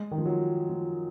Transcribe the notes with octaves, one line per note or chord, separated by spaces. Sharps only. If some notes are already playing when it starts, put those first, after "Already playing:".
Already playing: G#3
D#3
F3
F#3
F3